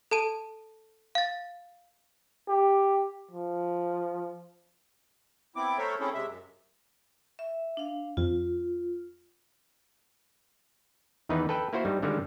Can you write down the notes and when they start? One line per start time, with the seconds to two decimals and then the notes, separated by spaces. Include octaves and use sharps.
0.11 A4 A5 D#7
1.15 F5 A6
2.49 G4
3.31 F3
5.56 B3 C4 E4 D6
5.78 A3 A4 A#4 C5 C#5 E5
6.00 A3 C4 C#4 E4 G#4 A4
6.14 C3 G#3 E5
6.26 F#2
7.39 E5
7.77 D4 F5
8.17 F2 F4
11.29 E2 D#3 E3 D#4 B4
11.49 A4 B4 G5
11.73 A#3 E4 F#4 C5
11.85 G2 G3 D#4
12.02 G2 D3 D#3 G3 G#3